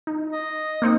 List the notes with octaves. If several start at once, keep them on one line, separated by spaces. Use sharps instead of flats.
D#4
D#5
A#3 C4 D#4